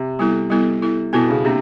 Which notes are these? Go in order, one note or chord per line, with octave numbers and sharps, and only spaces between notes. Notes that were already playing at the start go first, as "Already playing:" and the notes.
Already playing: C3
G3 B3 E4 A4
G3 B3 E4 A4
B3 E4 A4
B2 B3 E4 A4
C#3
C3 A#3 D4